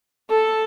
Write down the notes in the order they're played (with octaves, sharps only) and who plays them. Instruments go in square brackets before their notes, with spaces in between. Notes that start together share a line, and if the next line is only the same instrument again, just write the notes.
[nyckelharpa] A4